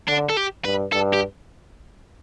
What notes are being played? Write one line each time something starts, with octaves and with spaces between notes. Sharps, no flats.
D3 D4
A4
G4
G2 B4
G2 A4
G4